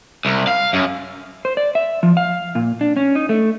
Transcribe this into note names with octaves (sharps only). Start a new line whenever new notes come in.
C2
F5
F#2
C5
D5
E5
F3
F5
A#2
D4
C#4
D#4
A3